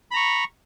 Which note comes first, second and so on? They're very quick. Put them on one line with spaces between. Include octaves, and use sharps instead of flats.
B5 A#5 C#6